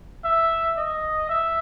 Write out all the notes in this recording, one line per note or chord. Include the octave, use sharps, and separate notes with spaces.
E5
D#5
E5